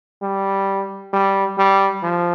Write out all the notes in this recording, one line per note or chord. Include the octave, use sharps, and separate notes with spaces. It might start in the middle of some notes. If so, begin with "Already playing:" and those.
G3
G3
G3
F3